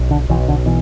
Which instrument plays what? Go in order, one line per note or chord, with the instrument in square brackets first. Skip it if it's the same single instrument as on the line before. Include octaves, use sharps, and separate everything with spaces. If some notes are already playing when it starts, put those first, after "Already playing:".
Already playing: [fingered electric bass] B1
D3
B1 E3
D3
B2 E3